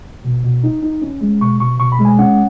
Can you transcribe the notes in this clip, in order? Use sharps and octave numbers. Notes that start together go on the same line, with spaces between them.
B2
B2
D#4
D#4
C#4
G#3
B2 C#6
B2 C#6
B2 C#6
B5
G#3
G#5
C#4 F#5